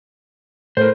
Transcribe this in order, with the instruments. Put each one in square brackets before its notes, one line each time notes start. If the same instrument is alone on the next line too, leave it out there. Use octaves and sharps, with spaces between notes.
[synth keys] A2 [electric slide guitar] A#4 C5